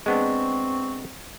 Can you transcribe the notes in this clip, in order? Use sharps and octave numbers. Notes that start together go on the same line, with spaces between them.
G#3 B3 C4 D4 C#6